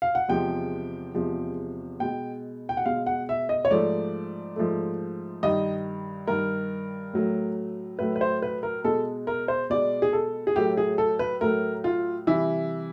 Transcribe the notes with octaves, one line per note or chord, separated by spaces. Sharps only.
F5
F#5
E2 C3 F3 G#3 G5
E2 C3 F3 G#3
B2 G#3 G5
G5
F#5
B2 G#3 F5
F#5
E5
D#5
C#5
G#2 F3 A3 D5
G#2 F3 A3
G2 D#3 G3 D#5
G2 D#3 G3 A#4
A2 F#3 A3
A2 F#3 A3 B4
B4
C5
B4
A#4
B2 G#3 A4
A#4
C5
B2 G#3 D5
G#4
A4
G#4
A2 F#3 A3 G4
G#4
A4
B4
A2 F#3 A3 A#4
F4
C3 E3 G3 E4